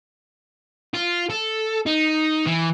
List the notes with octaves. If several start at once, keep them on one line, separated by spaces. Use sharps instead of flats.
F4
A4
D#4
E3